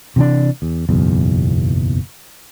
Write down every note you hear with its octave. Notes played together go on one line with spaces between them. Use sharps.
C3 E3 C4 D4
E2
F#1 B1 E2